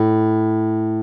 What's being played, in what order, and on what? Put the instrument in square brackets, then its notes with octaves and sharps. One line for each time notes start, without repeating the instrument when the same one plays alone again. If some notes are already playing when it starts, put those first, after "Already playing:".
Already playing: [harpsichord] A2